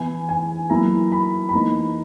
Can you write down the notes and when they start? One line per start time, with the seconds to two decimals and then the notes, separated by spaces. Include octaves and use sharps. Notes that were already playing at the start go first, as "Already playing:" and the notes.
Already playing: E3 B3 E4 G#5
0.29 G#5
0.70 F#3 A#3 E4 A#5
1.12 B5
1.49 B5
1.53 E3 A#3 D#4 A#5